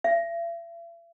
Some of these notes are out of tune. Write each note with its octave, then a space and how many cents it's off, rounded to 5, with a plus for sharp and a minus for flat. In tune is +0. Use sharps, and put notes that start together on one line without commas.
E5 +40